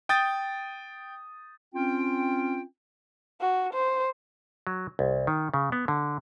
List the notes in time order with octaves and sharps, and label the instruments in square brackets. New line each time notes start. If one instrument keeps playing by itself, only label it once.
[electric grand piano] G5 D#6 G6 A6
[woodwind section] C4 C#4 F4 G5
[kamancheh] F#4
C5
[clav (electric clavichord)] F#3
C2
D#3
C#3
B3
D3